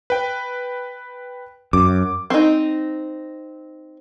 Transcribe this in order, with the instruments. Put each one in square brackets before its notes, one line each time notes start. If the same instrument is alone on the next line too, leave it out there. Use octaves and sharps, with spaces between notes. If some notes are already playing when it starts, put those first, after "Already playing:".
[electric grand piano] B4 G5
[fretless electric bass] F#2 [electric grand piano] D6
[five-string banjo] C4 D#4